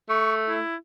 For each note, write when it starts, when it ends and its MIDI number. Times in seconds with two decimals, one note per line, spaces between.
0.10 0.59 57
0.10 0.33 85
0.49 0.76 64